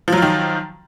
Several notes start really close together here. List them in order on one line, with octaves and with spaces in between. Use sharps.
F3 F#3 F4 D#3